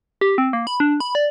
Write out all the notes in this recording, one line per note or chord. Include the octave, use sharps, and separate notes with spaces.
G4
C4
A#3
B5
D4
B5
D5